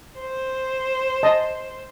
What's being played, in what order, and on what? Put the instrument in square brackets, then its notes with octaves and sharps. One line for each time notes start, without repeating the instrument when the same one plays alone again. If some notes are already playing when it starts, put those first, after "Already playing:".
[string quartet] C5
[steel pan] D#5 A5